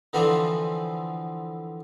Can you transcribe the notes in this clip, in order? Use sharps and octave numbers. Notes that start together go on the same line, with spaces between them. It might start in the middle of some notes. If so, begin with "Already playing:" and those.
D3 E3 F3 B3 C4 D4